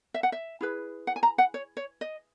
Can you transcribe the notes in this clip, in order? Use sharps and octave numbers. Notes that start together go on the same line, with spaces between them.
E5
F#5
E5
E4 G#4 B4
F#5
G#5
A#5
F#5
C#5
C#5
D#5